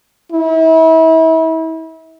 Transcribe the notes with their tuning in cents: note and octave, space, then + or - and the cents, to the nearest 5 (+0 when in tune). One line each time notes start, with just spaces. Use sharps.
E4 -35